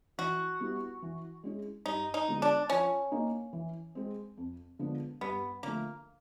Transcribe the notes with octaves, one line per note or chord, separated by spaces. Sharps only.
E3 F#4
G3 B3 E4
E3
G#3 C#4 E4 G#4
G2 D#4
D#4
D3 F3 G#3 B3
D4
F3 C#4
A#3 D#4
E3
G#3 C4
F2
D3 F3 G#3 B3
G2 B3
D3 F3 A3 A#3